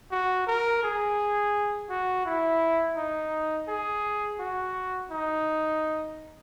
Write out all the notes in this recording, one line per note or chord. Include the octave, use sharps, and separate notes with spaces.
F#4
A#4
G#4
F#4
E4
D#4
G#4
F#4
D#4